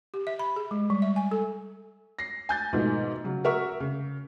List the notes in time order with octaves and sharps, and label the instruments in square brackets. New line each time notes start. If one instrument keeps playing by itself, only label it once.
[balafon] G4
E5
B5
G#4
G#3
G3
E5
G#5
A4
[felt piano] A#6 C7
G#5 G6 A6
G#2 B2 D#3 F3 A3
C#3 F#3
F#4 A#4 E5 C#6
C#3